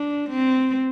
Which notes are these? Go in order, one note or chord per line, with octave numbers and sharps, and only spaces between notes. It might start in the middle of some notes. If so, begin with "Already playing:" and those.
Already playing: D4
C4